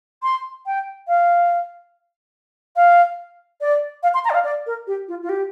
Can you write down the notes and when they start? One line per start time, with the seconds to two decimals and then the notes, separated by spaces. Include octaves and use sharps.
0.23 C6
0.66 G5
1.08 F5
2.76 F5
3.61 D5
4.03 F5
4.14 C6
4.25 A#5
4.30 D5
4.34 F5
4.45 D5
4.66 A#4
4.87 G4
5.08 F4
5.23 F4
5.29 G4